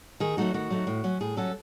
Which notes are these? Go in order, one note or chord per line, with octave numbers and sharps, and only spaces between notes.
D#3 G#4
F#3 A3 D#4 F#4
D#3 F#4
F#3 A3 D#4
A2
F#3 C#4
A2 G#4
F#3 C#4 A4